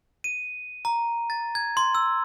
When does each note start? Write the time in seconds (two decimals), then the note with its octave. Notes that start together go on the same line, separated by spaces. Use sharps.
0.24 D#7
0.85 A#5
1.30 A6
1.55 G#6
1.77 C6
1.95 E6